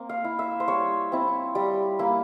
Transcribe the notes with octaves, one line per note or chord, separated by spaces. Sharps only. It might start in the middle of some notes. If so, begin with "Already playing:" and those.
Already playing: A#3 C4
F5
E4
E5
C5
G3 C#5
C4 E4
G3
A#3 E4